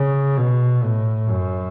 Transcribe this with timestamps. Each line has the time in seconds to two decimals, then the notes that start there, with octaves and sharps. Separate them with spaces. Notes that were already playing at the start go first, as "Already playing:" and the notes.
Already playing: C#3
0.37 B2
0.82 A2
1.27 F#2